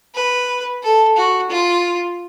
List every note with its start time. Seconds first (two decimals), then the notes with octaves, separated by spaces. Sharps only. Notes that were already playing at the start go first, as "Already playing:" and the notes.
0.15 B4
0.83 A4
1.16 F#4
1.50 F4